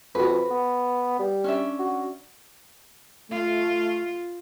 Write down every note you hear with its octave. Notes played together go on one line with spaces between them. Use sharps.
F2 F#4 B4
B3
G3
C#4 D4 E5
F#4
A3 F4